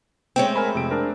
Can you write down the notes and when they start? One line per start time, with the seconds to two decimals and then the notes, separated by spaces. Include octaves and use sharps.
0.36 G#3 A3 C4 C#5 G5
0.56 A#4 G#5 B5
0.75 F2 C3 D7
0.91 D4 A#4